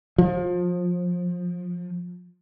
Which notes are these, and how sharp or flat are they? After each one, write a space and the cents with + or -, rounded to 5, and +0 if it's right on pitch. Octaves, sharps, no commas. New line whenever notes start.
F3 +25